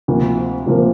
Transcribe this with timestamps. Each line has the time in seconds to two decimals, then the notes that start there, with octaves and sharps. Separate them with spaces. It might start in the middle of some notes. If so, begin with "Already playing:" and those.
0.08 D2 C3 F3 A#3
0.66 D2 C3 F3 A#3